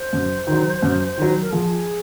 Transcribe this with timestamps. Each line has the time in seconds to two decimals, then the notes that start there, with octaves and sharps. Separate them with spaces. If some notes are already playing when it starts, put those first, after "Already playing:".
Already playing: C5
0.13 F#2
0.47 D#3
0.52 F#3
0.83 F#2
1.18 D#3 F#3
1.41 A#4
1.52 F3 G#4